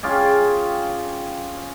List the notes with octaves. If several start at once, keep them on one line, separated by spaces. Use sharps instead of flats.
C#4 F4 G4 G#4